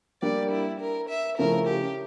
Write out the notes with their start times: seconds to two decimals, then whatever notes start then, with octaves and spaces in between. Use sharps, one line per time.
0.22 G3 A#3 D4 G4 D5
0.51 E4
0.80 A#4
1.10 E5
1.38 C#3 F3 A3 C#4 E4 A#4
1.68 G4